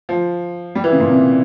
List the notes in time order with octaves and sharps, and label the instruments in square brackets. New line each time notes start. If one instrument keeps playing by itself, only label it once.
[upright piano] F3
G3
E3
C#3
A#2
C3